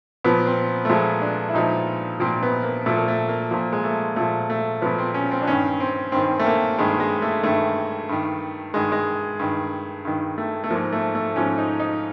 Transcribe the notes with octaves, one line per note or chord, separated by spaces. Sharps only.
A#2 F3 B3
C4
A3
A#2 F3 G#3
D4
E4
A#2 F3 D#4
A#2 F3 C4
B3
A#3
A#2 F3 A3
A#3
A3
A#3
A#2 F3 A#3
G#3
A3
A#2 F3 A3
A3
A#2 F3 B3
C4
C#4
C4
D4
G2 D#3 C#4
C4
G2 D#3 C4
A3
A#3
G2 D#3 G#3
G#3
A3
G2 D#3 A3
G2 D#3
G2 D#3 G#3
G#3
G2 D#3
G2 D#3
A3
A3
G#2 F3 A#3
A3
A3
G#2 F3 C#4
D#4
D#4